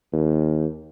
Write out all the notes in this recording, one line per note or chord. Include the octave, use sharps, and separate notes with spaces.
D#2